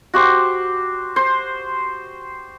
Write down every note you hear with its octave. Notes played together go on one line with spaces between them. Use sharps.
F#4 G4 C5
C5